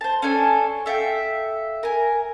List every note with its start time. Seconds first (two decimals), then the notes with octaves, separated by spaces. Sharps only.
0.01 C5 A5
0.22 C#4 D4 A4 G#5
0.86 A4 E5 F5 G5
1.83 A#4 G#5